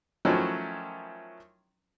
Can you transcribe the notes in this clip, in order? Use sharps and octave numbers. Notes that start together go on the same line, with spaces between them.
D#3 F3 F#3 A3 C#4 E4